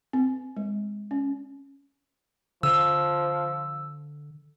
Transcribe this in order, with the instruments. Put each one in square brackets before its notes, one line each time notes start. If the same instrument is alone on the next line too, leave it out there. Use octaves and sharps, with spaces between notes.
[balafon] C4
G#3
C#4
[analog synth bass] D3 [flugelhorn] F3 [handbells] E6